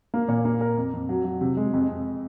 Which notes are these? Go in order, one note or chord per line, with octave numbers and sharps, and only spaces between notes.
A#3
A#2
A#3
A#4
F2
F2
F#3
F#3
C3
G#3
F2
F2